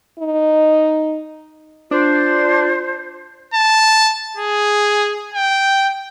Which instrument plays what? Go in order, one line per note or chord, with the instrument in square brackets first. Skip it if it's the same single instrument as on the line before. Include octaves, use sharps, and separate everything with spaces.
[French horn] D#4
[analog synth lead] D4 [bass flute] F4 [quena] C5
[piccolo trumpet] A5
G#4
G5